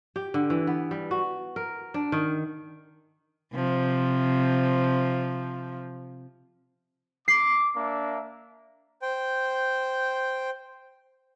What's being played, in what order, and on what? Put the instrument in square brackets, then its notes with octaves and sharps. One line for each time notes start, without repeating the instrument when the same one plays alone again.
[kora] G4
D3
E3
B3
G3
F#4
A#4
D4
D#3
[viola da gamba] C3 F3
[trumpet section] D6 [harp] C7
[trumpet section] A#3 D4 E5
[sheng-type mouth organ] C5 G5